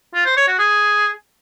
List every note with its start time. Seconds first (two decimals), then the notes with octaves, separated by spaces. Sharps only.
0.14 F4
0.25 C5
0.37 C#5
0.48 F#4
0.59 G#4